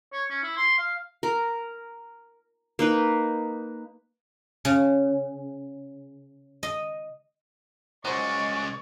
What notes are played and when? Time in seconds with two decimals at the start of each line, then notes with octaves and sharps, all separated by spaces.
0.13 C#5
0.30 C#4
0.43 E4
0.57 C6
0.78 F5
1.23 A#4
2.79 A#3 D#4 B4
4.65 C#3
6.63 D#5
8.05 C#2 F#3 G#3 C5 D5 C#6